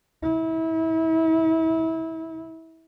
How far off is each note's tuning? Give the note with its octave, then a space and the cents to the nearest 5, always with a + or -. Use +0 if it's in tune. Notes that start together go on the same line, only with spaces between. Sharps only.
E4 -30